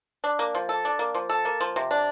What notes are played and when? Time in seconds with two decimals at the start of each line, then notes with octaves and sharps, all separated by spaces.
0.24 D4
0.39 A#3
0.55 F3
0.69 A4
0.85 D4
0.99 A#3
1.14 F3
1.29 A4
1.45 A#3
1.61 F3
1.76 C3
1.91 D4